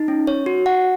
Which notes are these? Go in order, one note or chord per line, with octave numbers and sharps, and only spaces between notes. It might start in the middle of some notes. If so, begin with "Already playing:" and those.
Already playing: D#4
C#4
C#5
F#4
F#5